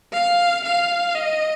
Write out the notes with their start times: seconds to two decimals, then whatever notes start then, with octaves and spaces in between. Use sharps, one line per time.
0.12 F5
0.65 F5
1.15 D#5